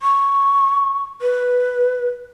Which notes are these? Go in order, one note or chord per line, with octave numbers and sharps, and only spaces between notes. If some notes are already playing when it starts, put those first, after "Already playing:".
C#6
B4